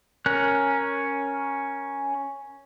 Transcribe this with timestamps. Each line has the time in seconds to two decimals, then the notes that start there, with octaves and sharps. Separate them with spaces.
0.26 C#4 A#4 F#6